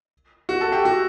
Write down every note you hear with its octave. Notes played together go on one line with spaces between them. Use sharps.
F#4
A4
G4
F#4